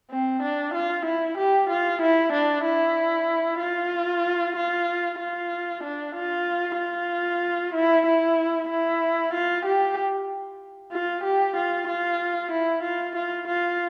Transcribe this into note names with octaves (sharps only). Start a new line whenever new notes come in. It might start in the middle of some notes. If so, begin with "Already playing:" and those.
C4
D4
F4
E4
G4
F4
E4
D4
E4
F4
F4
F4
D4
F4
F4
E4
E4
E4
F4
G4
F4
G4
F4
F4
E4
F4
F4
F4